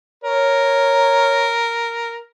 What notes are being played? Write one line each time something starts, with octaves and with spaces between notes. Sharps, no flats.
A#4 C#5